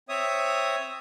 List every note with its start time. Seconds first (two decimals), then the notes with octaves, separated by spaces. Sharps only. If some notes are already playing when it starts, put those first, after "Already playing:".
0.09 C4 C#5 E5 D#6